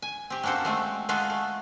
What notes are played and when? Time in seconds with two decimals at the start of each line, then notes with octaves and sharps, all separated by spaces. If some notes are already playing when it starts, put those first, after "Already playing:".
0.02 G#5
0.30 C4 G4
0.43 A#3 C#4 F#4 A4 C5
0.65 G#3 A3 C4
1.09 G#3 F4 F#4 G#4 A4
1.30 A3